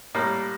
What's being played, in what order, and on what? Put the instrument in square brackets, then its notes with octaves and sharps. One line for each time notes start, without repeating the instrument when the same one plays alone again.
[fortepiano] A2 G3 A#3